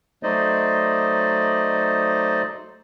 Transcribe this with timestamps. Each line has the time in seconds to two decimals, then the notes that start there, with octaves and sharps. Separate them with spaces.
0.23 F#3 A3 D#4 C5 D5 D#5